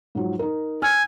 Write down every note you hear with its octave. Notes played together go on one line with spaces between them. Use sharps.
G#2 F3 F#3
D#4 A#4
G#5 E6 F6